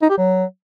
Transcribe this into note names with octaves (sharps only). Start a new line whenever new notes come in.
D#4
G4
F#3